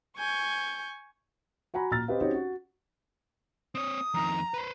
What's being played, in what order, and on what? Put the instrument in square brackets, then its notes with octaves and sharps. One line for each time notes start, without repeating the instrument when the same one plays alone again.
[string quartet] G#5 C#6 G6
[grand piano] F#4 F#5 G#5 A#5 B5
A#2 A#5 F6 A6
C4 G4 B4 D#5 F5
C4 C#4 D#4 F#4 G4 C#5
F#4
[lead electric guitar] C4 C#5 [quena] D#6
[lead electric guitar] F2 D#3 [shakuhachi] A#5
[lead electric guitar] B4 C5 [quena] B5